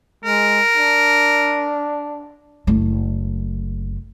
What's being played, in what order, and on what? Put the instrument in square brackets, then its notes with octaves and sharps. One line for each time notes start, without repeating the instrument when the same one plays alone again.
[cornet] G#3 [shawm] A#4
[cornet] D4
[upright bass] F#1 A3